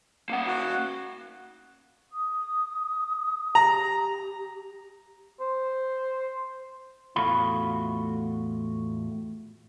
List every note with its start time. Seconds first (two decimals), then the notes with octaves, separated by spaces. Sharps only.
0.30 A#3 F#5
0.47 F#4
2.12 D#6
3.55 G4 A#5
5.40 C5
7.16 E2 A2 A3 F4 F#4 B5